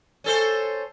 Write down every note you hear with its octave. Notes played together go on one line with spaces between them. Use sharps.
C#4 A4 C5